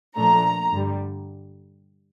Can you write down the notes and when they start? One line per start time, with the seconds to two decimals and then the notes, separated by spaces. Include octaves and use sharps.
0.16 A#2 F3 A3 D4 A#5
0.71 G2 D3 G3